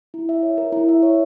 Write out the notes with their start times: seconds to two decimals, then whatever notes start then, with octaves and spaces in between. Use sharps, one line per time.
0.14 E4
0.29 E5
0.43 C#5
0.58 A#4
0.72 E4
0.89 E5
1.03 C#5